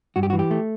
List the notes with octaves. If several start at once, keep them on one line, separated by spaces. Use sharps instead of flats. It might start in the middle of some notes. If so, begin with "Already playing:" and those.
G2 F#4
G4
E3 F#4
G4
A3